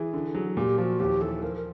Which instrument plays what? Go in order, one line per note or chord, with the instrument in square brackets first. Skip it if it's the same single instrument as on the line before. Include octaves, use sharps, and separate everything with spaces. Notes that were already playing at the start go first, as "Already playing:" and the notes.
Already playing: [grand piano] E3 [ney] G#4
[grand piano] D3
F#3
[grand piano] A#2 [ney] G4 G#4
[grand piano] F3 [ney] G4
[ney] F#4
[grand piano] D#2 [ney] G4
[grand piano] E3 [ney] A4
[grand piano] F3 [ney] A#4
[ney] A#4